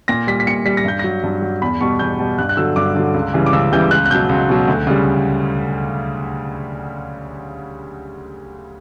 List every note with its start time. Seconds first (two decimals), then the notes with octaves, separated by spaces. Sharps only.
0.08 A#2 A#6
0.27 G3 B6
0.40 B6
0.47 A#2 C#7
0.66 G3 B6
0.77 A#6
0.85 G2 G6
0.99 F#3 A#6
1.24 G2
1.42 F#3
1.62 E2 B5
1.81 B2 G3 C#6
1.99 E2 G6
2.19 B2 G3
2.38 G2 F#6
2.49 F#6
2.57 D3 F#3 E6
2.76 G2 D6
2.95 D3 F#3
3.14 C#2
3.34 C#3 E3 G3
3.46 D6
3.53 C#2 E6
3.72 C#3 E3 G3 G6
3.91 C#2 F#6
4.05 F#6
4.10 B2 F#3 G6
4.29 C#2
4.49 B2 F#3
4.68 D2
4.87 C#3 G3